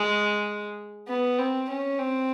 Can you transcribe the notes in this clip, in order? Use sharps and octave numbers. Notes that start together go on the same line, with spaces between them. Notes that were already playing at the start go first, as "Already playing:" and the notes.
Already playing: G#3
B3
C4
C#4
C4